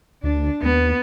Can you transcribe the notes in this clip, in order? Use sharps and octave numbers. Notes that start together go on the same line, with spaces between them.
D2 D4
D#2 B3